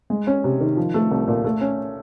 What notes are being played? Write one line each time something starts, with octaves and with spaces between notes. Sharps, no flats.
G#3
C#4
C3
D#3
F3
A3
C2
A#2
A3
C#4